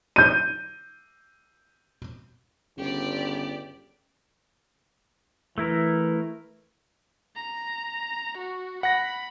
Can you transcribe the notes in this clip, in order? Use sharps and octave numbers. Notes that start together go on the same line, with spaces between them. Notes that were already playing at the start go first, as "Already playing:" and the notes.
G6 D#7
G1 C#3 G4 D5
E3 A3 E4 A#4
A#5
F#4
F#5 B5 A#6